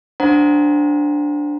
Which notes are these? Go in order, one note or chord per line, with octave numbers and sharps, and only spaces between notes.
D4 C5 F#5 A#5